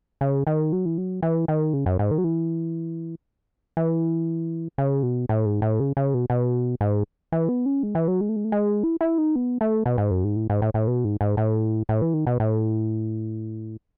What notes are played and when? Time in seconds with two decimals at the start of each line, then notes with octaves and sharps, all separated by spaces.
0.21 C#3
0.47 D#3
0.72 F#3
0.86 E3
0.98 F#3
1.23 E3
1.48 D#3
1.73 C#3
1.86 F#2
1.99 G#2
2.11 D#3
2.18 F#3
2.24 E3
3.77 E3
4.78 C#3
5.03 B2
5.29 A2
5.46 G#2
5.62 A2
5.80 C#3
5.97 C#3
6.14 B2
6.30 B2
6.81 G#2
7.32 E3
7.49 B3
7.66 C#4
7.83 G#3
7.95 E3
8.08 F#3
8.21 G#3
8.29 A3
8.36 G#3
8.45 A3
8.52 G#3
8.83 E4
9.01 E4
9.18 D#4
9.35 B3
9.61 A3
9.86 B2
9.98 G#2
10.11 F#2
10.24 G#2
10.36 A2
10.50 G#2
10.62 A2
10.74 A2
10.87 B2
11.04 G#2
11.21 G#2
11.37 A2
11.89 A2
12.02 E3
12.14 D#3
12.27 B2
12.40 A2